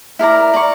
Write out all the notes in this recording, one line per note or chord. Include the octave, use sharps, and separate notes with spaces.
E4 A#4 D5 A#5
D5 A#5 C#6